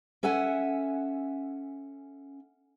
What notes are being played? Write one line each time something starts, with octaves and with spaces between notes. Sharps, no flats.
C#4 A4 E5 F#5 G#5